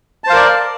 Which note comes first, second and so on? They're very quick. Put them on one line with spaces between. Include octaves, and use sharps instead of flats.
A5 C5 F5 A#4 D5